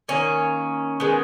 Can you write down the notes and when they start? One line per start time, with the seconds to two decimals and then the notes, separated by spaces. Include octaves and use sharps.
0.09 D#3 A#3 C#4
1.00 D#3 G#3 B3